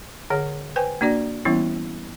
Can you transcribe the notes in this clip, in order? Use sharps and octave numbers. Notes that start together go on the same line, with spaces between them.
D3 G#4 C#5 F#5
B4 C5 G5 G#5
A#3 D4 F#4 D5
E3 G3 B3 C#4 E4